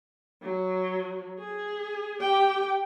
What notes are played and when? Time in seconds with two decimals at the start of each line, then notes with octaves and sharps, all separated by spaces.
0.42 F#3
1.39 G#4
2.20 G4 G5